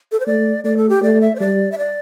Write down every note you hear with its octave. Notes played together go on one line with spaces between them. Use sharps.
A4
C5
A3 D5
A3 D5
A4
G4
A3 D5
E5
C5
G3 D5
E5
D5